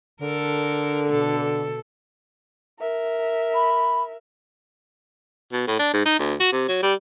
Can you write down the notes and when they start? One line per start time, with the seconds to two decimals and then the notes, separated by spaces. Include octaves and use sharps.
0.21 D3 A4 A#4
1.09 B2 A4
2.80 A#4 E5
3.54 B5
5.53 B2
5.67 A2
5.79 D4
5.94 G#2
6.06 D#4
6.19 D2
6.40 F#4
6.52 C3
6.68 F#3
6.83 G3